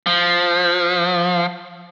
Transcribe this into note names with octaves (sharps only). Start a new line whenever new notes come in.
F3